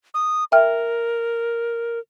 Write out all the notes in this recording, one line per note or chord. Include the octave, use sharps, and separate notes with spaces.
D#6
A#4 E5 G5 F6